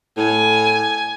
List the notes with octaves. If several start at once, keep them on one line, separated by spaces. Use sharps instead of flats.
A2 G#5